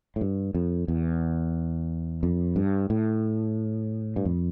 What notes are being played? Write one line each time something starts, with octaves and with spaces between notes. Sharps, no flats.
A2
G2
F2
E2
F2
G2
A2
G2
F2